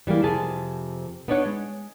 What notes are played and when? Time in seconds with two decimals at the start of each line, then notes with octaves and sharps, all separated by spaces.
0.07 E3 G3 G#3 A#3
0.23 F2 C3 G#4 A5
1.28 B3 D4 D#4 C#5 F#5
1.46 G#3